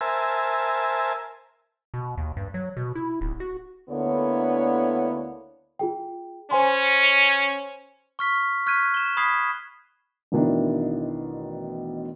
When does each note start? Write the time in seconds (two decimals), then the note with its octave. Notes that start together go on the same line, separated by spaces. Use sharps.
0.01 A#4 C5 E5 G#5 A5
1.94 B2
2.18 D#2
2.37 G2
2.54 F#3
2.77 B2
2.95 E4
3.21 D1
3.40 F#4
3.89 D2 D3 A#3 B3 E4 C#5
5.79 F4 G#4 G5
6.51 C#4 C5 G#5 C6
8.19 C#6 F6 B6
8.66 C#6 F6 F#6 G#6 B6 D#7
8.94 E7 G7
9.17 B5 D#6 F#6 G#6 B6 C7
10.32 A1 B2 D#3 D4 E4